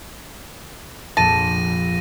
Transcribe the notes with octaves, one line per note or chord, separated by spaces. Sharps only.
A#1 F2 A5 A#6 D#7